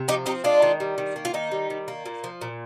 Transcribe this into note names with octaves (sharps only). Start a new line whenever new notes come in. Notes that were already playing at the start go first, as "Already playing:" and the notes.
Already playing: C3
F3 D#4 G4
C4 D#4 G4
G#3 D4 F4
D#3
G3
D#3
A#3
F4
D#3 D#4
G3
D#3
A#3
A#2
F3
A#2